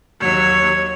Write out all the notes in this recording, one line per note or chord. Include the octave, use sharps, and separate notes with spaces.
D#2 F#3 C#5 E6